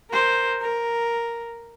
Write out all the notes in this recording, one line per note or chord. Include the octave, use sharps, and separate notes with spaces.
A#4 C5
A#4